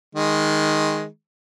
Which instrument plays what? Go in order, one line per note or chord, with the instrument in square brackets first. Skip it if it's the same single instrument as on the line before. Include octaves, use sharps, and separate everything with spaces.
[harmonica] D#3 G#3